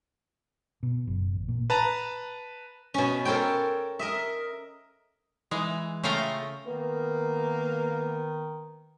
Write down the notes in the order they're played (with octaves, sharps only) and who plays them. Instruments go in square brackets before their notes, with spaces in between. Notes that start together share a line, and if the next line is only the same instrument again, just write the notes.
[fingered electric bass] B2
F#1
A1
A#2
[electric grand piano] B4 A5 A#5
[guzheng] B2 C#4
A4 A#4 C5 C#5 G5
A#4 D#5 E5
[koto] E3 G#3
C#3 A3 F4 F5 G5 A#5
[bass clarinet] D#3 [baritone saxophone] A#3 [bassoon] B3